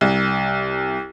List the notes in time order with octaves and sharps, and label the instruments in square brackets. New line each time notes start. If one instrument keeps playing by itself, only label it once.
[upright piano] C2